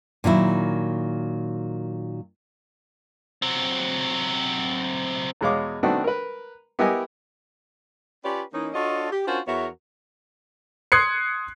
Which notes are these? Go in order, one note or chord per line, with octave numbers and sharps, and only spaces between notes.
A#2 D#3 F#3 E4
F#3 C4
E2 B2 G#3 C#5 F5 D6
D#3 A3 B3 C4 D4 F#4
A#4 B4
B3 E4 G4 A#4 D#5 G#5
C#4 F4 G4 B4 C#5 D5
E3 A#3 C#4 D#4
D4 F4 F#4 A4 C#5 D#5
G4
C#4 D4 F4 F#4 A#4 C5
E2 B3 F#4 A#4 C#5 E5
C6 D#6 F#6 G#6 C7 C#7